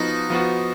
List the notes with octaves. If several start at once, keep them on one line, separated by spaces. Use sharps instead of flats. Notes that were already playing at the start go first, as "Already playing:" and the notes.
Already playing: F3 B3 D#4 F#4
F3 B3 F#4